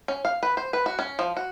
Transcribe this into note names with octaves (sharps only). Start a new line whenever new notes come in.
C#4
F5
B4
C5
B4
F#4
C#4
F3
F#4